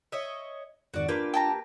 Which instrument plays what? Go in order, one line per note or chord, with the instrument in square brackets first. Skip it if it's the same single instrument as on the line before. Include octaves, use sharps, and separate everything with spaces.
[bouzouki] C#5 D#5 E5
[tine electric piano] F2 G#2 D#3 [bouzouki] F#4 D5
[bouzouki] A#3 G4 B4 [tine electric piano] D4 F4 A#4
[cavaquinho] G5 A5 A#5